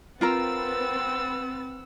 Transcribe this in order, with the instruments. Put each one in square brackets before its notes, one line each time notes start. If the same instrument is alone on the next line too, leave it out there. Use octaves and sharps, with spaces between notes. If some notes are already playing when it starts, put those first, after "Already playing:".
[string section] C4 B4 A6 [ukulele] F4 A#4 A#5 [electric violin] F#5 E6